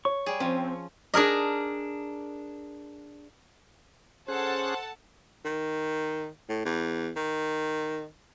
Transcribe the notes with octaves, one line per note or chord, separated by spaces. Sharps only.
C#5 C#6
G3 G#4
F3 C4 C#4
D4 G#4 A#4 D#5
C#4 G#4 A4 C5 F#5 A5 F#6
D#3
A2
E2
D#3